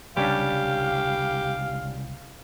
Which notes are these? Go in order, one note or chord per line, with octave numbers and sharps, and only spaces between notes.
C2 C#3 G3 C#4 D4 G4 F5